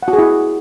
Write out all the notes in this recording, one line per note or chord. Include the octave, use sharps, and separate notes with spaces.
F#5
F#4
G#4
E4